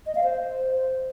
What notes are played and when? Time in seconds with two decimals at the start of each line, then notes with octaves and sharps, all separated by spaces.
0.06 D#5
0.15 F5
0.24 C5